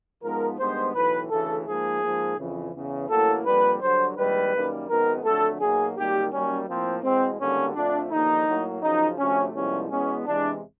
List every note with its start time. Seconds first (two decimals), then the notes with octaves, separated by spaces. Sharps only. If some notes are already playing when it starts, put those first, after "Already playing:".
0.23 G#2 F3 G#3 B3 A#4
0.59 G2 D#3 G#3 B3 C5
0.95 B1 A2 E3 B4
1.30 D2 C#3 E3 A3 A4
1.66 G#2 F3 A#3 G#4
2.02 G#2 F3 A#3
2.38 F2 C#3 E3
2.74 E2 C#3 E3
3.10 A1 A2 F#3 A#3 A4
3.45 F2 D3 G3 A#3 B4
3.81 G2 D3 F#3 C5
4.16 A#1 G#2 D#3 G3 B4
4.53 F#2 D#3 G3 A#3
4.89 G#1 F#2 D#3 G#3 B3 A#4
5.24 F2 D3 F#3 A3 A4
5.60 B1 B2 F#3 A#3 G#4
5.96 G#1 F#2 D#3 G3 A#3 G4
6.32 F#2 D#3 G3 A#3 C#4
6.68 A2 F3 A#3 C4
7.03 E2 B2 G#3 C4
7.39 G#1 G2 D3 G3 A#3 C#4
7.75 F2 D3 F3 A3 D4
8.11 D#2 D3 F3 A#3 D#4
8.46 A2 F#3 A#3
8.82 F#2 C#3 F3 D#4
9.18 D2 C3 F3 A3 C#4
9.54 C2 C3 F3 G#3 B3 C#4
9.90 E2 B2 G#3 B3 C#4
10.26 E2 C3 E3 G#3 D4